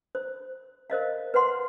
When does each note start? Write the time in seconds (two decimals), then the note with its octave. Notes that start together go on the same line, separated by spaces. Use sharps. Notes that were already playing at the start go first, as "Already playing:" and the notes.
0.15 C5
0.90 A#4 C5 D#5 F5
1.34 B4 C5 F#5 C6